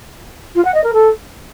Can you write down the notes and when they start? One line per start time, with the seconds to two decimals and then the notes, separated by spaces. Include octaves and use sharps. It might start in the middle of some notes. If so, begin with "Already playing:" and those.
0.55 F4
0.65 F#5
0.74 D#5
0.84 A#4
0.93 A4